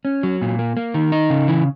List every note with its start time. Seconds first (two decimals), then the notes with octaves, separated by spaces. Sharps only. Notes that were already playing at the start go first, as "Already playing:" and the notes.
0.05 C#4
0.23 F#3
0.42 A#2
0.59 A#3
0.77 A#3
0.94 D#3
1.12 D#4
1.30 C#3
1.48 E3